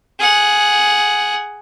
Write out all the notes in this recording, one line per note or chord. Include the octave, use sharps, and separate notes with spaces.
G#4 F#5